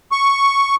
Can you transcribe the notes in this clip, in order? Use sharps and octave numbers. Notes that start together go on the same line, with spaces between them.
C#6